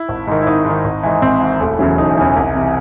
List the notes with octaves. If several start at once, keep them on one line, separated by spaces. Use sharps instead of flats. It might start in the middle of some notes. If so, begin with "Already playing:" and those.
Already playing: E4
G#1
G#2 D#3
E4
G#1 D#4
G#2 D#3
G#1
G#2 E3
G#1 C4
G#2 E3
E1 A3
E2 C#3 E3 F#3
E1 D#4
E2 C#3 E3
C2
C3 E3